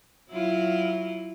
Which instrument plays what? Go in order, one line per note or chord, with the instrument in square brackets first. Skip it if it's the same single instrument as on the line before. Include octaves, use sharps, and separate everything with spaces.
[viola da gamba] F#3 E4 F4